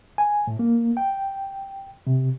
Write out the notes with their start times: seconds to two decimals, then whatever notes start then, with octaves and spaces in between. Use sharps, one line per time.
0.18 G#5
0.47 A2
0.59 A#3
0.97 G5
2.07 C3